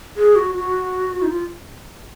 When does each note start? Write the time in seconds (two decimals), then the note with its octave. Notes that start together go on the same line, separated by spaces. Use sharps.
0.17 G#4
0.36 F#4
0.55 F#4
1.22 D#4
1.29 F4